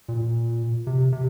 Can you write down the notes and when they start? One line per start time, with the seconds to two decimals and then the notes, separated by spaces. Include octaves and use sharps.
0.08 A#2
0.87 C3
1.12 C3